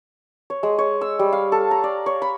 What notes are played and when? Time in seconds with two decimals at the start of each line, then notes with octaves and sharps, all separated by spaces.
0.50 C#5
0.63 G#3
0.78 C#5
1.01 E6
1.19 G3
1.33 F5
1.52 A4
1.71 A#5
1.84 D5
2.06 C#5
2.22 B5